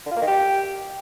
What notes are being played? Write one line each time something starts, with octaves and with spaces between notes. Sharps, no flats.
D3
F4
A#3
D#3
G4